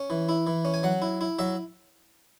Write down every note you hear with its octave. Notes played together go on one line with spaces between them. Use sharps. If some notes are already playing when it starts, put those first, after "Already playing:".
Already playing: C#4
E3
E4
E3
C#4
G#5
F#3 F#5
E4
E4
F#3 E5